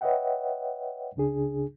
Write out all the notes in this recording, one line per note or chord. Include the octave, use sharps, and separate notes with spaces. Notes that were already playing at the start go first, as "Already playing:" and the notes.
B4 C#5 D#5 E5 F#5 G5
C#2 C#3 D4 G#4